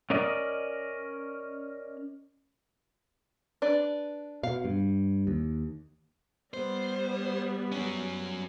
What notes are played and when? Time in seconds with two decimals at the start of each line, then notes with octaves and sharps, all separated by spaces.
0.10 C#4 A#4 D5 D#5
3.62 D4 B4 D5
4.43 B2 F5
4.65 G2
5.27 D#2
6.54 G3 B3 C5
7.72 F#3 C#4